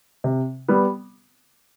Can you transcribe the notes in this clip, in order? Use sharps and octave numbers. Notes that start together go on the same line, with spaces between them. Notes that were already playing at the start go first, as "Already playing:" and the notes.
C3
G3 B3